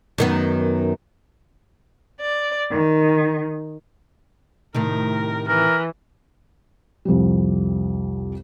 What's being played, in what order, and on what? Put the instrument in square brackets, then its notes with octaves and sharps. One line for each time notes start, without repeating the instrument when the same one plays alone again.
[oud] F#2 D#3 B3
[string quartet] D5
D#3
[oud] A2 C3 D#3 [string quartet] A#4
[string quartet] E3 [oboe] A#4
[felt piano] C2 F2 F3 G3